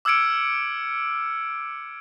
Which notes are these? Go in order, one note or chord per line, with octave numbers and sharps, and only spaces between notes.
D6 E6 F6 G#6 C#7 D7